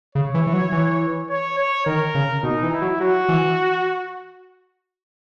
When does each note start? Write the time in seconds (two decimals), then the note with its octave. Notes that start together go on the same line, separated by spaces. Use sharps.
0.15 C#3 C#5
0.34 E3
0.47 E3
0.53 F#3
0.72 E3
1.29 C#5
1.58 C#5
1.86 D#3 A#4
2.15 C#3
2.43 B2 D#4
2.63 E3
2.72 E4
2.82 F#3
3.00 F#3 F#4
3.29 E3